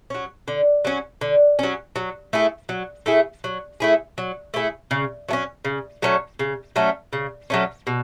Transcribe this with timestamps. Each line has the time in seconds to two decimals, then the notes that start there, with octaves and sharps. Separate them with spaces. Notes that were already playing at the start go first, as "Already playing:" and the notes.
0.10 F#3 C#4
0.48 D3
0.85 F#3 C#4
1.21 D3
1.59 F#3 C#4
1.96 F#3
2.33 A3 E4 G#4
2.69 F#3
3.06 A3 E4 G#4
3.44 F#3
3.80 A3 E4 G#4
4.18 F#3
4.54 A3 E4 G#4
4.91 C#3
5.29 F#3 A3
5.33 C#4
5.65 C#3
6.02 F#3 A3 C#4
6.39 C#3
6.76 F#3 A3 C#4
7.13 C#3
7.50 F#3 A3 C#4
7.87 B2